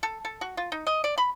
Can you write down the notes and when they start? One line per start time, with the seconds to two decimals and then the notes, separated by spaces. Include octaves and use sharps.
0.03 A4
0.25 A4
0.41 F#4
0.57 F4
0.72 D#4
0.87 D#5
1.04 D5
1.18 B5